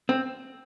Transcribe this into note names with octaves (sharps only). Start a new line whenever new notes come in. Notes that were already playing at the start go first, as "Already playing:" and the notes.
C4